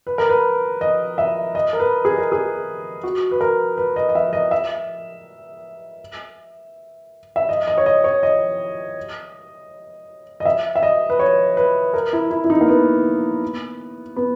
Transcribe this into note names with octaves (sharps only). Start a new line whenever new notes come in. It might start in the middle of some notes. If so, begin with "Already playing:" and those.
B4
A#4
B4
D#5
E5
D#5
A#4
B4
G#4
A#4
G#4
F#4
B4
A#4
B4
D#5
D#5
E5
D#5
E5
E5
D#5
D#5
C#5
D#5
C#5
D#5
D#5
E5
E5
D#5
B4
C#5
B4
A#4
E4
E4
E4
D#4
A#3
B3
B3